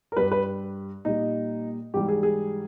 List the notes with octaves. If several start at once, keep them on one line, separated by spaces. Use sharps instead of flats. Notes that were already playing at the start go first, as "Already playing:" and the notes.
A#4
G2 G3 B4
B4
A#2 G3 D#4
G#2 E3 G3 G4
G#4
G#4